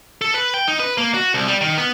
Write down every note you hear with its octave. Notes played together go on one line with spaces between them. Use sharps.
A4
B4
G5
D#4
B4
A#3
F#4
C2
G3
D#3
B3